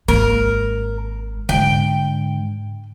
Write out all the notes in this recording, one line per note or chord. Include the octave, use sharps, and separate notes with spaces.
G#1 A#3 A#4
G#2 D3 G5